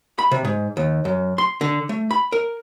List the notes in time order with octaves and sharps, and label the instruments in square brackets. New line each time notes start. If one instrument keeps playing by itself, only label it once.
[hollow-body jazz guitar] B5
C3
G#2
D#2
F#2
C6
D3
A3
B5
A#4